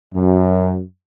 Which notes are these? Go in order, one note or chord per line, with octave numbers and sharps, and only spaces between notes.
F#2